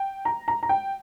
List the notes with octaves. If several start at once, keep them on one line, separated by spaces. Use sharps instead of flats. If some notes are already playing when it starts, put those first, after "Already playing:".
Already playing: G5
A#5
A#5
A#5
G5